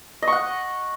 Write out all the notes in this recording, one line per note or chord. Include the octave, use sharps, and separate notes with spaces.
D#5
C#6
F#5